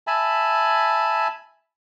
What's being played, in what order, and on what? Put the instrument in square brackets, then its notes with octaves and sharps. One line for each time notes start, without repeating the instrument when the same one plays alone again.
[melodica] E5 G#5 A5 B5